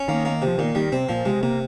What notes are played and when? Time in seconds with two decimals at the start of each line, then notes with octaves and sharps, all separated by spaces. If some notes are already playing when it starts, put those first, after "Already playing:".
Already playing: C#4
0.08 D#3 A#3
0.25 A#3
0.42 C3 F3
0.58 A#2 D#3
0.75 D#3 G3
0.92 C3 C4
1.09 A#2 F3
1.25 C3 G#3
1.43 C3 A#3